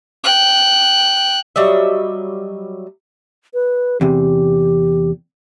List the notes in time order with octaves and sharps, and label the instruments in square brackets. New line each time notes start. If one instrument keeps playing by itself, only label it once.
[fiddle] G5 F#6
[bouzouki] F#3 G3 D#5 E5
[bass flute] B4
[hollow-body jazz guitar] E2 C3 [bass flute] G4